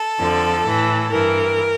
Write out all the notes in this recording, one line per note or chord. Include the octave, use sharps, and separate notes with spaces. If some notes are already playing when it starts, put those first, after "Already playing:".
Already playing: A4
F2 D3 F3
A2 E3
G2 E3 A#4